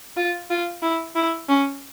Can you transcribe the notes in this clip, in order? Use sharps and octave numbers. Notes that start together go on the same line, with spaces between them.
F4
F4
E4
E4
C#4